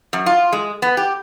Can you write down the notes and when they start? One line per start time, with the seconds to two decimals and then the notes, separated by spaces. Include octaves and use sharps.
0.13 F#2
0.26 F4
0.52 G#3
0.82 B3
0.97 G4